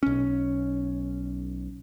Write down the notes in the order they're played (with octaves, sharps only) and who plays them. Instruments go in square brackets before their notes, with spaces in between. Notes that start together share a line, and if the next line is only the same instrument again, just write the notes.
[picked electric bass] B1 C#4